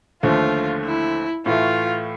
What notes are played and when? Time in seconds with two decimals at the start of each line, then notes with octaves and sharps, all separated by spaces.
0.23 D#2 D3 F3 A3 F4
0.85 E4
1.46 A2 E3 A3 F4